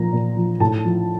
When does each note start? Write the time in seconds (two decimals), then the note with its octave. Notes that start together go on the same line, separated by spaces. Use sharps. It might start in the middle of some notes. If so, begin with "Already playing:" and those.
Already playing: A#2 F3 A#5
0.13 A#2
0.36 F3
0.60 A2 A5
0.85 F3